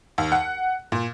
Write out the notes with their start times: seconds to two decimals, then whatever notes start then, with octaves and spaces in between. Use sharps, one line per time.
0.18 D#2
0.32 F#5
0.92 A#2